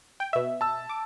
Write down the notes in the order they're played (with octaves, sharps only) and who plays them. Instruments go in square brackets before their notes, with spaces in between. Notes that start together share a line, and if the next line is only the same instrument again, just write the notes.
[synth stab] G5
B2 E5
[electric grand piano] A5 E6
[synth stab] D6